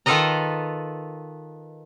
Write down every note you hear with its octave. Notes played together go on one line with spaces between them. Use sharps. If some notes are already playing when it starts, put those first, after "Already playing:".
D#3 F4 A4 B4 D#5 A#5